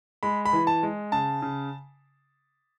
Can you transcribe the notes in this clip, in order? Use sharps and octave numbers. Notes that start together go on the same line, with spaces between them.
G#3 B5
B5
E3
A5
G#3
C#3 A5
C#3